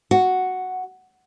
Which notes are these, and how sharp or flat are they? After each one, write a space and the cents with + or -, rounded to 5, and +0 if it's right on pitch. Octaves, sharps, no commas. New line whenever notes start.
F#4 +0 F#5 +0